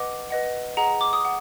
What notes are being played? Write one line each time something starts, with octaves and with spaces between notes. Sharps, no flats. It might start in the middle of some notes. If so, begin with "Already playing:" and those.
Already playing: B4 D#5 F#5 D6
B4 D#5 F#5
G#4 D#5 F#5 A#5
D6
D#6
F#5